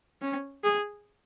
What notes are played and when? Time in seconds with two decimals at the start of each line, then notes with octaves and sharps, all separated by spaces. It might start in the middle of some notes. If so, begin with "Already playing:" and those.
0.22 C#4
0.64 G#4